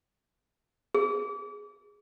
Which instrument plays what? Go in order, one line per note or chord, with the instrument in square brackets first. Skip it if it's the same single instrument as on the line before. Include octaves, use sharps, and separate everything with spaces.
[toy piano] G#4